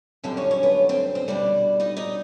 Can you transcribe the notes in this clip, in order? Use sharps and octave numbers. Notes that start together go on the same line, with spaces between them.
F#2 D3 G3 C4 C5
C#4 C#5
C#4 C#5
B3 B4
C4 C5
C4 C5
B2 G3 D4 D5
D#4 D#5
D#4 D#5